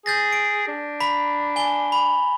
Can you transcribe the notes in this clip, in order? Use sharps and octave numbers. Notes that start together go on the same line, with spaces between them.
G#4 G6 A6 A#6
D7
D4
A#5 B5 B6
G#5 G7
B5